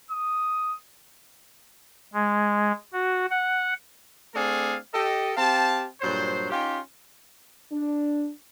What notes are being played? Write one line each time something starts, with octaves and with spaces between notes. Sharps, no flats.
D#6
G#3
F#4
F#5
A3 C4 D4 G#4 A4 F5
G4 A4 D#5
C4 G4 F5 A5
G2 A#2 F#3 C5
C#4 D#4 F4 G4
D4